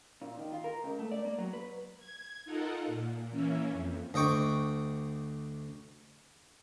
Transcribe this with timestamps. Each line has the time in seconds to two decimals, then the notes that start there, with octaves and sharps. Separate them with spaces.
0.21 A#2
0.38 D#3
0.52 F4
0.64 A#4
0.84 C#2
0.99 A3
1.12 D5
1.25 A#3
1.38 F#3
1.53 B4
1.98 G#6
2.45 D#4 F4 A4 A#4 F#5
2.87 A#2
3.31 E3 A#3 C#4 E4
3.71 F2
4.14 D2 D#5 G5 C#6 D6